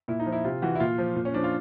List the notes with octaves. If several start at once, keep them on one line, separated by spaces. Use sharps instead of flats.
A#2 E4
D#4
F3
E4
C3 F4
E3 F#4
E4
A#2 F4
F3
A#2
C#4
F3 D4
F4